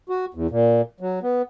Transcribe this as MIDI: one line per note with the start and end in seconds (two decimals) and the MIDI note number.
0.09 0.25 66
0.34 0.47 40
0.50 0.81 46
1.00 1.19 54
1.23 1.42 59